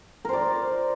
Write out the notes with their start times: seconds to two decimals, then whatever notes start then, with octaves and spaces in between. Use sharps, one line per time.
0.25 A#4
0.29 C5
0.33 D5